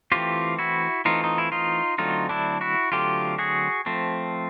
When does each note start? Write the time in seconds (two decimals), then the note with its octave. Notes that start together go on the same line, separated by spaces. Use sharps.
0.12 E3 A3 C4 F4 G4
0.59 E4 F#4
1.05 E3 A3 C4 D#4 F4
1.24 D#4
1.38 E4
1.52 D#4 F4
1.98 D3 F#3 A3 C4 D#4 F4
2.29 D4 E4
2.61 E4 F#4
2.92 D3 F#3 A3 C4 F4 G4
3.38 F#4 G#4
3.86 F3 A3 C4